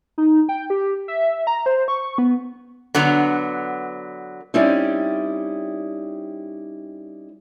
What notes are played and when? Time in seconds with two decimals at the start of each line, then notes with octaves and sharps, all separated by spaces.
0.18 D#4
0.49 G5
0.70 G4
1.08 E5
1.47 A#5
1.66 C5
1.88 C#6
2.18 B3
2.95 D3 F#3 B3
4.54 G3 C4 C#4 D#4 E4 D5